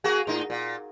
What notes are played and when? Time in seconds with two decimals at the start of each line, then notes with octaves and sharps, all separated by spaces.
0.04 A#3 F#4 G#4
0.27 A2 D#4
0.50 A#2